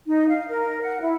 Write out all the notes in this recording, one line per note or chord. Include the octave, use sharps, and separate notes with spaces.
D#4
F5
A#4
F#5
E4